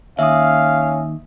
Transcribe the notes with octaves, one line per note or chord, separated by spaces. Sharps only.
D#2 C#4 E5 F5 D#6